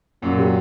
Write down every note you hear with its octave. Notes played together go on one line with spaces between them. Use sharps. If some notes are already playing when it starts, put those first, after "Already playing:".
F#2 A#2 F#3
C3